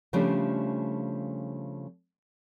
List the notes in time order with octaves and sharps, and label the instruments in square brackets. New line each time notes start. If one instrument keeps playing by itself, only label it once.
[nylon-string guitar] C#3 F3 G3 A3 C#4 D4